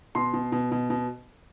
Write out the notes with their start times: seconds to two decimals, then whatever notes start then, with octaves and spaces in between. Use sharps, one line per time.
0.15 B2 C6
0.34 B2
0.52 B2
0.72 B2
0.90 B2